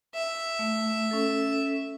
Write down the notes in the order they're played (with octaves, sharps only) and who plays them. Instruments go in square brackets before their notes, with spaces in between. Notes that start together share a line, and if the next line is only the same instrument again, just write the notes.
[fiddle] E5
[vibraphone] A3
C#4 A4